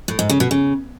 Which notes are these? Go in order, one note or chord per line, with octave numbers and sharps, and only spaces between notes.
A2
G#2
C#3
B2
C#3